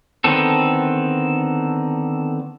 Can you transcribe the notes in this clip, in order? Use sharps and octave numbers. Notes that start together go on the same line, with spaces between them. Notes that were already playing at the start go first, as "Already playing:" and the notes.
D3 D#3 B3 C4 A4